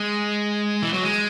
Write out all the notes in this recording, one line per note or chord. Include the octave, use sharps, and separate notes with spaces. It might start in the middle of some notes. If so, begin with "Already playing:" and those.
Already playing: G#3
E3
F#3
G#3